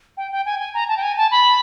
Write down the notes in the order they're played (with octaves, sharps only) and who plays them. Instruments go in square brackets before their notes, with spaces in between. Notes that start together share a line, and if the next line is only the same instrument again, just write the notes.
[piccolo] G5
G5
G#5
G#5
A#5
A5
G5
G#5
A5
B5